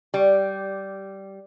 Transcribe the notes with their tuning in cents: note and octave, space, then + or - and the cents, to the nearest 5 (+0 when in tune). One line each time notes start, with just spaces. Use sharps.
G3 -10